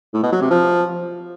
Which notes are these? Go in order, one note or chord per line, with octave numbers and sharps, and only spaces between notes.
A2
B2
F#3
C3
F3